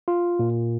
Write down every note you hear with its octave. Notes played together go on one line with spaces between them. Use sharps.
F4
A#2